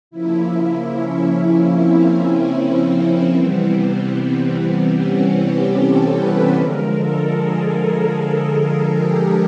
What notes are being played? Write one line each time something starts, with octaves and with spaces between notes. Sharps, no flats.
C#3 F3 A#3 E4
C#4
C#4
C4
C4
C#4
C4
C3 E3 G3 B3
C#4
G4
A4
B4
D3 F3 G#3 A#4
A4
G#4
G4